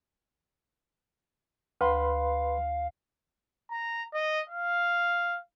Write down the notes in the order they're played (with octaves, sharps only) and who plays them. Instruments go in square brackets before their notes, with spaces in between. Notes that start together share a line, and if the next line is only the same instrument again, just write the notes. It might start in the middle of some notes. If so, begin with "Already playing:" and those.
[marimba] D2 [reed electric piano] B4 B5 C6 [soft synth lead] F5
[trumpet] A#5
D#5
F5